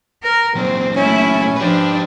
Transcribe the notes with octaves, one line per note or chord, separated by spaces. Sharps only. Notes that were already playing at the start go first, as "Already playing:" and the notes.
A#4
A#2 F#3 C4
A3 C#4 E4
F3 D4 G4 B4